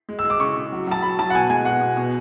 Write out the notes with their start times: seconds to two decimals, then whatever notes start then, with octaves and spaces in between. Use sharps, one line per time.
0.09 G#3
0.19 E6
0.24 G#3
0.30 D6
0.40 C#3 C#6
0.56 C#3
0.72 F#3
0.87 F#3 A5
1.02 F#3 B5
1.19 F#3 A5
1.30 F#5
1.34 B2 G#5
1.50 G#3 G#5
1.65 B2 F#5
1.81 B2
1.97 B2